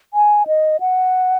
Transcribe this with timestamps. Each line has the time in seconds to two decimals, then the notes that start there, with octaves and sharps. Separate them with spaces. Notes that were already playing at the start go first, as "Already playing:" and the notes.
0.14 G#5
0.47 D#5
0.80 F#5